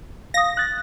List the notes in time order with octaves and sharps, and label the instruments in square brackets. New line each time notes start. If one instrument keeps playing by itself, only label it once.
[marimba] F5 D#6 [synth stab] A#6
[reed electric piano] F#6 A6